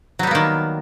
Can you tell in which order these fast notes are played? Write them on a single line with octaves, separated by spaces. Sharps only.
F#3 G3 B3 A#3 D#3